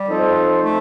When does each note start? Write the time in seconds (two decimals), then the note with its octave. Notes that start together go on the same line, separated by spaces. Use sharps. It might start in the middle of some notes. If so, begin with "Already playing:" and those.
Already playing: G3
0.08 F3 C4 D#4 A4 C5
0.62 A3